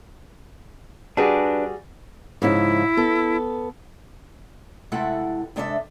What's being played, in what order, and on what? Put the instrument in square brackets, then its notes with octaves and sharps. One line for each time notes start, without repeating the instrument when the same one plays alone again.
[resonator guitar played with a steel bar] G3 F#4 G#4 [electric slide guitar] D4 B4 D5
[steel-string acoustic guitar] G#2 C#3 F3 [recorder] E4
[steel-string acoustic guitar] B3 A4
C3 G#3 A3 E4 A4 F#5
C3 G#3 D4 A4 D#5 E5